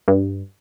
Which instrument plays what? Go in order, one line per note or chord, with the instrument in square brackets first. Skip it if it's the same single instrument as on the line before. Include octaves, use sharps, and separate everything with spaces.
[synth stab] G2